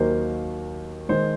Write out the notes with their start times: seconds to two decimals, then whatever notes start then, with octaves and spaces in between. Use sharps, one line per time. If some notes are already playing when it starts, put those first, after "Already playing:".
Already playing: D#2 D#3 F#3 A#3 C5
1.09 D#3 G#3 C5